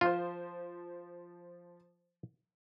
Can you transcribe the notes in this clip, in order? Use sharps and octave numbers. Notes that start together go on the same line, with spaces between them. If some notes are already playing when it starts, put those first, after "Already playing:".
F3 F4 C5